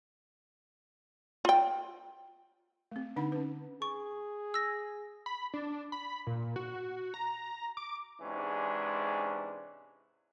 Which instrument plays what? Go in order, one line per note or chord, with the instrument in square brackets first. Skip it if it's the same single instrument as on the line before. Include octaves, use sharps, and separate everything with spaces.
[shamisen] F4 G5
[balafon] A3 C4
D3 D4 D#4 F#5 B5
C#4 B4
[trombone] G#4 [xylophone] C#6
[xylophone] E6 A#6
[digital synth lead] B5
D4
B5
A#2
F#4
A#5
D6
[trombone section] G#2 C3 E3 G#3 C#4 D4